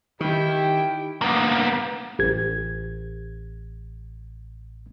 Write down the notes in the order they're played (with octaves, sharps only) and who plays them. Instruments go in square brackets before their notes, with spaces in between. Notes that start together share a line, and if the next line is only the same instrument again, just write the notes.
[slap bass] D#3 [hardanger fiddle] E4 G5 [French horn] G4
[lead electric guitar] A#3 B3
[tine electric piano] A1 G#6